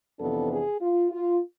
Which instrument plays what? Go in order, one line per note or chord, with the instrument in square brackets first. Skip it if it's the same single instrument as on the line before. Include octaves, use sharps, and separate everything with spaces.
[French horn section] F2 C3 E3 B3 D4 A4
G#4
F4
F4